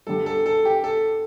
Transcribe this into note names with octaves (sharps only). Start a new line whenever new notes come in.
G2 D3 G3 A4
A4
A4
G4
A4